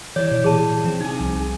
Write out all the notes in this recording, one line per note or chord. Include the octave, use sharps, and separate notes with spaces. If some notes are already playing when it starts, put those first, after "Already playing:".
E3 E4 C#5 D5
B2 C#5
A#2 E3 G#4 A5
F3 C4
C3 D#4 G#4
C2